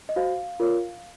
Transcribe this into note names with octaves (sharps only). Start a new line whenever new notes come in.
D#5
F#4 C5 F5
F4 A#4 C#5